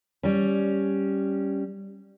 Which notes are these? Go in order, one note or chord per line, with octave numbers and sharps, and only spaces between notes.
G3 C#4